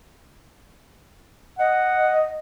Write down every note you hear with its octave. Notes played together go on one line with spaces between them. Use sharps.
D#5 F#5